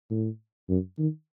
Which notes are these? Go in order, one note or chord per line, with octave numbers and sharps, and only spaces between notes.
A2
F#2
D#3